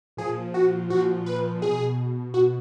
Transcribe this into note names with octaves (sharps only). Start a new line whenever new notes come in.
A#2 F3 G#4
F#4
A#2 F3 F#4
B4
B2 G#4
B2 F#4